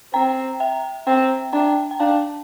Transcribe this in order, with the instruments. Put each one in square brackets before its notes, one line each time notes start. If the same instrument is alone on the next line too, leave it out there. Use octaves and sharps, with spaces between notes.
[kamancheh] C4 [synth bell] G5 A#5
[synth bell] E5 G5
[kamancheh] C4 [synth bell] G5 A#5
[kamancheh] D4 [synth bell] G5 A#5
[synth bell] G5
[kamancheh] D4 [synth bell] F5 A5